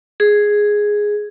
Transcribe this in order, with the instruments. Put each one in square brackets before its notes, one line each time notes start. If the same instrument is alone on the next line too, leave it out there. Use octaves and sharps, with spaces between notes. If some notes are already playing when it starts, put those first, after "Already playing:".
[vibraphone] G#4